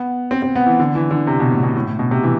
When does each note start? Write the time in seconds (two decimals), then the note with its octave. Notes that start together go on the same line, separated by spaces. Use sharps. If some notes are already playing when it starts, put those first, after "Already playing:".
Already playing: B3
0.31 C4
0.42 C4
0.55 B3
0.66 E3
0.80 D3
0.95 E3
1.11 D3
1.27 C3
1.40 B2
1.51 A2
1.63 B2
1.76 A2
1.87 A2
1.99 B2
2.11 C3
2.23 E3